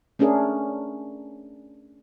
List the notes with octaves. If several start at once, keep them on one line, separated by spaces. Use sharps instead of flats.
A3 C#4 D4 G#4 A#4